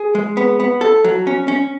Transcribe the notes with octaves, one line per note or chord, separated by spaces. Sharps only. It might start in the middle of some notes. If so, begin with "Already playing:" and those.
Already playing: G#4
G#3
B3
B3
A4
F#3
C#4
C#4